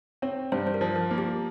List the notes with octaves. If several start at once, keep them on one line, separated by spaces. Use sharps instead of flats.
C4 C#5
G2 C5
C5
A#4
F3
A#4
A#3
G4